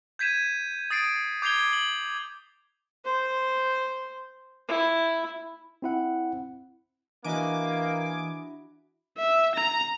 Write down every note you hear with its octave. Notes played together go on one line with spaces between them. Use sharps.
G6 G#6 B6 D#7 E7
D#6 A6 C7 D7
D6 G6 G#6 C7 F7 G7
F#7
C5
E4
C4 E4 F#5
E3 A#3 D4 E4 F#4 D#5 G#5 D6
E5
A#5